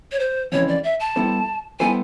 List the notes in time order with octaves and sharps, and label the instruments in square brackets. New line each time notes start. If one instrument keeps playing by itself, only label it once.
[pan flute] C#5
C5
[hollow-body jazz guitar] F2 C#3 E3 G#3 C4 [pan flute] C#5
[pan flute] D5
E5
A5
[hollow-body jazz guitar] G3 B3 E4 A4 C5
[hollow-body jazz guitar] G3 B3 E4 A4 C5 [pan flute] G#5